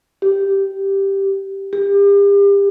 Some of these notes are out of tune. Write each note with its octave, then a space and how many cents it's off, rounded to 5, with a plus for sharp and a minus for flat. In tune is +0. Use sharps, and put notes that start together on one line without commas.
G4 -5
G4 +35